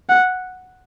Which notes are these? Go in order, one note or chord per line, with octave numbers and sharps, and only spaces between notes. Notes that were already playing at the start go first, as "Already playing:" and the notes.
F#5